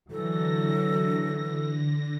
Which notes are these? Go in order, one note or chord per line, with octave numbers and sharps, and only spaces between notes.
D3 E3 F#3 A4 A#6